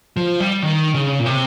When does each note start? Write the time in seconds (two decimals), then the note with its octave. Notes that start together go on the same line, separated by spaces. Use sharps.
0.17 F3
0.40 G3
0.63 D#3
0.94 C#3
1.19 A#2
1.26 C3